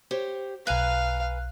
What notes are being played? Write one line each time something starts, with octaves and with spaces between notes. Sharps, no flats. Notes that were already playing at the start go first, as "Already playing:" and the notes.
G4 C5 C#5
B1 B4 F5 G#5 A#5 F#6